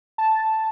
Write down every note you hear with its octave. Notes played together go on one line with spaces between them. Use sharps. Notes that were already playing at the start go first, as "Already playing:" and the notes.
A5